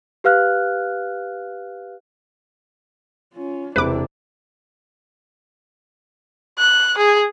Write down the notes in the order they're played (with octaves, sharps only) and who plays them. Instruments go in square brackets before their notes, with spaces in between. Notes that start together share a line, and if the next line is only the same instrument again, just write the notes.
[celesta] G4 B4 F5 F6 F#6
[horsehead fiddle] C#4 F4
[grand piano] E1 C3 [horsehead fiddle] D4 E4 [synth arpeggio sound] B4 D6
[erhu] F#6
G#4